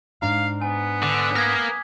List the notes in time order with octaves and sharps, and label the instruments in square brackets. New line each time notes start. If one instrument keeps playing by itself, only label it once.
[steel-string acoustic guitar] G#2 D4 A#5 [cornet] F5
[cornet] B3 [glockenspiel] G#5
[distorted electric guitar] D3 [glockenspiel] D6
[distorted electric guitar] A#3 A#4 [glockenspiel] D#6 G#6 B6